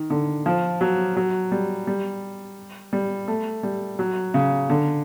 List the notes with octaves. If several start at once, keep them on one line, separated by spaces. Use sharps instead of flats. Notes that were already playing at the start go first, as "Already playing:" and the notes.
Already playing: D#3
D3
F3
F#3
F#3
G3
G3
G3
A3
G3
F#3
C#3
D3